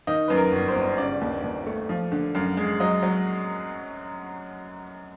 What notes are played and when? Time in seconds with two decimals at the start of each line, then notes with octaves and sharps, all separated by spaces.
0.07 D#3 D#5
0.28 F#2 B4
0.37 A#4
0.52 G1
0.68 C5
0.76 G1
0.98 C#3 D5
1.21 D#2
1.44 D#2
1.67 A3
1.89 F3
2.12 D3
2.35 F#2
2.57 G#3
2.80 F#3 D#5
3.03 F#3